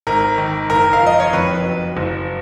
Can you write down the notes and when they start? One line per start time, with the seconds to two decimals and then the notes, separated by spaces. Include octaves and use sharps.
0.07 G#1 A#4
0.38 D#3
0.70 F#1 A#4
0.93 F5
1.01 F3 D#5
1.20 C#5
1.33 F2 B4
1.65 F#3
1.97 F#1